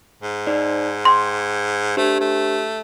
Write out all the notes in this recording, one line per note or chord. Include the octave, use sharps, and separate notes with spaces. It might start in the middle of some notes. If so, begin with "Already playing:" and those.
G#2
D#4 C5 D5
G5 C6 D6
A3 D4 G4 C5
A3